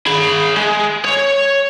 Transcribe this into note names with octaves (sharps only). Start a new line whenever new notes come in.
G#4 B5
G#3
C#5